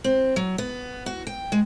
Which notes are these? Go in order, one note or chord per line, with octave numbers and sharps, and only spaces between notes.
C4
F#3
B3
F#4
G5
G#3